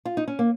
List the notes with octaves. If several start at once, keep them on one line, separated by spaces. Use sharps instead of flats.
F4
D#4
C#4
A#3